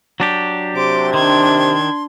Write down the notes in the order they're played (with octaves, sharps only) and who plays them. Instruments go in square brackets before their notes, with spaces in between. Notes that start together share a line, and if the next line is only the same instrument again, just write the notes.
[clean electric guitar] F#3 D4 G4
[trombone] C3 [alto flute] C6 [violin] D6
[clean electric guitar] D#3 [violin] D4 G#6 [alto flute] C6